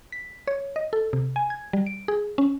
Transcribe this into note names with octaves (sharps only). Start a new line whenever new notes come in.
B6
C#5
D#5
A4
C3
G#5
G#6
G3
D7
G#4
C#4